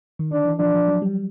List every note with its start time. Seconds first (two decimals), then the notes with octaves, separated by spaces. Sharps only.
0.19 D#3
0.31 D3 D4
0.45 E3
0.59 F3 D4
0.74 F3
0.88 F#3
1.02 G3